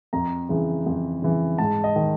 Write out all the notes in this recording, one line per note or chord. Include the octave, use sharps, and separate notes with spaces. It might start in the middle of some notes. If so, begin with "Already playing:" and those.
F2 A#5
C#3 E3
F2
C#3 E3
G#2 A5
D#5
D#3